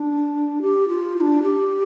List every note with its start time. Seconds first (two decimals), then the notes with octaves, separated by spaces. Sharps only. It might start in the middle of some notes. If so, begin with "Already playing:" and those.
Already playing: D4
0.62 G4
0.89 F4
1.16 F4
1.21 D4
1.43 G4